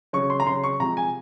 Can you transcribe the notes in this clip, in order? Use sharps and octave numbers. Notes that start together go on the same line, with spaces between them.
C#3 F#3 C#6
C6
A#5
C#3 F#3 C6
C#6
C3 F3 G#3 A#5
G#5